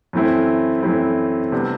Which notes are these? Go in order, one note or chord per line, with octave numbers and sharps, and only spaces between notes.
F#2 E3 A3 C4 E4
F#2 E3 A3 C4 E4
C3 G3 B3 D4